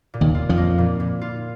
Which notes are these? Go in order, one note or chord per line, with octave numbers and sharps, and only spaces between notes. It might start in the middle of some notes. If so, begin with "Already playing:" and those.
A#2
D#2 D#3
F4
F2 F3
A#3
A#2
A#2
F4